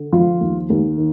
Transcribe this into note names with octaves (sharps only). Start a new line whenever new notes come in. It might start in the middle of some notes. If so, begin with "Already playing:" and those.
Already playing: D3
F3 F4
D#2
D#2
D#3